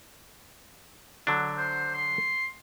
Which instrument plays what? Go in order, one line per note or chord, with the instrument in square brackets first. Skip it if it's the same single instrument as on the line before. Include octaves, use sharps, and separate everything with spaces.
[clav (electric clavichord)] D3 F#3 D4
[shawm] C5
C6